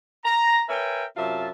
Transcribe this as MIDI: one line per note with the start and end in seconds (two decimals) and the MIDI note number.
0.25 0.63 82
0.69 1.05 70
0.69 1.05 71
0.69 1.05 73
0.69 1.05 76
0.69 1.05 79
0.69 1.05 80
1.17 1.49 42
1.17 1.49 48
1.17 1.49 65
1.17 1.49 76
1.17 1.49 81